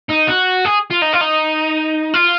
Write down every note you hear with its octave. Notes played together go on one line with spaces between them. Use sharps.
D#4
F#4
G#4
F4
D#4
F4
D#4
F4